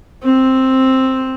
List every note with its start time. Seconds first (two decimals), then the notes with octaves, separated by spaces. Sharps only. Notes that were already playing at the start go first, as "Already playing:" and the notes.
0.23 C4